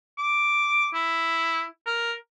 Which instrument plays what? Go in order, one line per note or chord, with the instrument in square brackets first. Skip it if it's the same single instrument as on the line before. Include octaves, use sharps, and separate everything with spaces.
[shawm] D6
E4
A#4